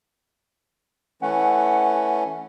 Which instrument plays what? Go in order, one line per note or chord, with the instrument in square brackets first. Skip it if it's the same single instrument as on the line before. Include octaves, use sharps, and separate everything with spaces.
[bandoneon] E3 A3 C#4 [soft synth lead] F#5